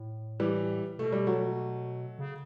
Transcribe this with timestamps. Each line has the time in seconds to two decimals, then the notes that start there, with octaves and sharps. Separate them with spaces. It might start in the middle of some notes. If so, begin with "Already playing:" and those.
Already playing: A2
0.40 E3 G3
0.99 B2 A3
1.12 G3
1.26 F#3 A3
2.19 C#3